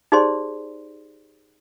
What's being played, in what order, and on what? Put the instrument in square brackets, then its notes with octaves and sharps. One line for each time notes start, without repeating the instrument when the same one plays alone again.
[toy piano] D#4 G4 G#4 C5 D5 C6